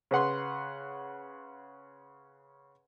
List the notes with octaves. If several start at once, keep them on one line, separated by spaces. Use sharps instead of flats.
C#3 B4 F#5 C6